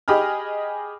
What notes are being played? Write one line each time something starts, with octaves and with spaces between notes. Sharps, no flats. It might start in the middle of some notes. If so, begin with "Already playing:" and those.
G4 G#4 D#5 B5 F6